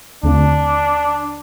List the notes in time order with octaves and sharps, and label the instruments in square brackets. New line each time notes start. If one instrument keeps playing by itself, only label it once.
[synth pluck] D#2 D3 A3 C4 F4 [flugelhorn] D4